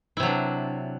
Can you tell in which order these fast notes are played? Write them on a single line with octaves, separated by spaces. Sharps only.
E4 C3 F#3 D4